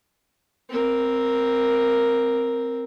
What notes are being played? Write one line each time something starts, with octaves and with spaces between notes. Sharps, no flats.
C4 A#4